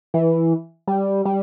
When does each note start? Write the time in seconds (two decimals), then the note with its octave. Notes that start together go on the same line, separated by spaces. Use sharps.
0.14 E3
0.87 G3
1.25 G3